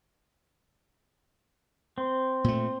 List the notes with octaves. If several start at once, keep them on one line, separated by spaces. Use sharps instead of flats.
C4
A#2 A3